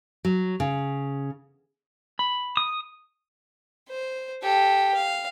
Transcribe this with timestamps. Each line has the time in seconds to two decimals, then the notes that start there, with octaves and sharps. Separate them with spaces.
0.25 F#3
0.60 C#3
2.19 B5
2.57 D#6
3.89 C5
4.42 G4 A4
4.95 F5